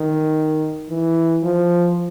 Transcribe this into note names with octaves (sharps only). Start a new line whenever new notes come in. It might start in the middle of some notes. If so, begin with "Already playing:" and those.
Already playing: D#3
E3
F3